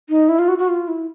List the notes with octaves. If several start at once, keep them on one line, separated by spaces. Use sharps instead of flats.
D#4
E4
F4
F#4
F#4
F4
E4